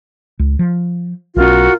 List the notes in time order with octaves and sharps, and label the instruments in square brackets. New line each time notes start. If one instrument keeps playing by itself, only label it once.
[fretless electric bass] C#2
F3
[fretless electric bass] B1 C#4 [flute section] F4 F#4 A#4